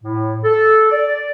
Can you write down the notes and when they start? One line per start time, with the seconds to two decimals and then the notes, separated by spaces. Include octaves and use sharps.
0.04 A2
0.44 A4
0.91 D5